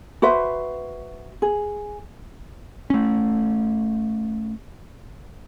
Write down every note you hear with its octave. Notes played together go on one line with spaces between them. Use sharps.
F#4 B4 C5 E5
G#4
A3 C#4